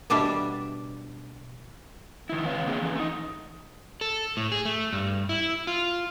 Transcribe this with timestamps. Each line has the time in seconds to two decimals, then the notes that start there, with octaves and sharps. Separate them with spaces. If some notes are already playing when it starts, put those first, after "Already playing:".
0.10 B2 G3 D4 D5 E5
2.30 D#3 E4
2.45 C#3 E3 C4 B4 C#5 F5
2.67 D3 A#3 C4 G#4 E5
2.82 E3 C#4
2.95 A3 D#4
4.01 A4
4.37 A2
4.52 G#4
4.65 A3
4.93 G2
5.29 E4
5.67 F4